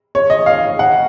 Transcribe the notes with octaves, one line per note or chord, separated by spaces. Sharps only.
C#5
D#5
F5
F#5